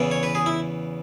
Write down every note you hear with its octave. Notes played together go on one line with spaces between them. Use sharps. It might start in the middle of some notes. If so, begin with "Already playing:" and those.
Already playing: E2 C#3 E3
C#5
B4
G#4
E4